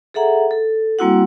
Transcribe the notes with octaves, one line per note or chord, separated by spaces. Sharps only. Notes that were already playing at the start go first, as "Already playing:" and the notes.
G#4 A4 E5 F#5 A#5
A4
G3 A#3 C4 E4 F#4 F#5